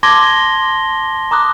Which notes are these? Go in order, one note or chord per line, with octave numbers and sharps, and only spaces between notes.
A5 C6 D6 G#6 A#6 G7
A#5 D6 D#6 F#6